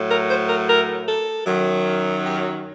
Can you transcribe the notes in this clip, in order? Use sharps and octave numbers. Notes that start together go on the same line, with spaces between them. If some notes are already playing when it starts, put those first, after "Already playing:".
Already playing: A2 F#3 A3
A#4
C5
A#4
A#4
A4
F#2 D#3 F#3
G4